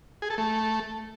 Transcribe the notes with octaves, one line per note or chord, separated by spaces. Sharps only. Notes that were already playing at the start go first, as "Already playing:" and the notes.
G#4
A4
A3